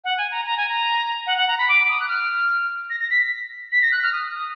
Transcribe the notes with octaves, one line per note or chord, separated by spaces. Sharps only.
F#5
G#5
A#5
A#5
G#5
A#5
F#5
F#5
A#5
B5
D6
D#6
F#6
F6
A#6
A#6
B6
B6
A#6
F#6
F6
D#6
D#6